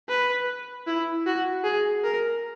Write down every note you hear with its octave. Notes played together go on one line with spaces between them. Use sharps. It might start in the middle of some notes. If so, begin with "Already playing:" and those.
B4
E4
F#4
G#4
A#4